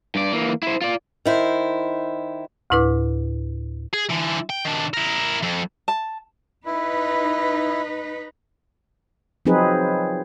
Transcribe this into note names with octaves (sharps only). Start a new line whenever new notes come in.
G2 D5
E3 A#3
E4 C5
F4 D5
D#3 E4 C5
D2 A2 E4 B4 D6
G#4
D3 E3
G5
D#3 D4
E4 A#4
F2
A5
D#4 E4 B4
F3 F#3 C4 D#4 G#4 B4